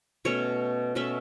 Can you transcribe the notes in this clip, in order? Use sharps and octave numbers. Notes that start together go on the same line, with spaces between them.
B2 A3 C#4 C#5
B2 A3 C#4 E5